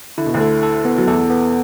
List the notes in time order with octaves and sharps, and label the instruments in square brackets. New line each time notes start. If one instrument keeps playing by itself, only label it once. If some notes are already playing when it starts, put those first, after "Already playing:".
[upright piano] D3 [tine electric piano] E4
[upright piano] B2
D2 D3
[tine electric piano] A4
A4
B3
[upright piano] F#3
[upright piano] E2 E3 [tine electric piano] A4
[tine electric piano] B3